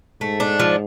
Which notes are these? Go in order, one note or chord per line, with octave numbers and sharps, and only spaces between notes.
G#2 A3
D4
F3